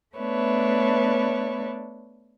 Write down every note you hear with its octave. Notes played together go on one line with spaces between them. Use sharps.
A3 B3 D4 B4 C#5 E5